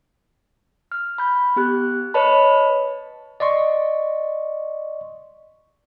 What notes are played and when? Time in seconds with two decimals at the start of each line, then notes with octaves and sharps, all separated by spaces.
0.92 F6
1.18 B5 G6
1.56 B3 G4 F#6
2.14 B4 C#5 D#5 A5 B5
3.40 D5 D#5 C6 C#6